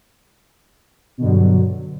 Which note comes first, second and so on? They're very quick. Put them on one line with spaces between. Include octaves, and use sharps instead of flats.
B2 D3 G2 F#3